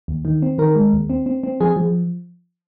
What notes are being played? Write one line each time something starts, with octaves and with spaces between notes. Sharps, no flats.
D#2
D#3
C4
D#3 A#4
G#3
D#2
C4
C4
C4
F3 G#4
F3